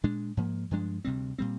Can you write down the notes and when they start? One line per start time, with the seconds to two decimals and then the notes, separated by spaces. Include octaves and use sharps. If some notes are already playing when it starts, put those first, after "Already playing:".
0.04 A#2 G#3 D4
0.37 G#2 F3 A#3
0.71 G2 F3 G#3 D4
1.05 D2 C3 G3 C4
1.38 A#2 G3 C4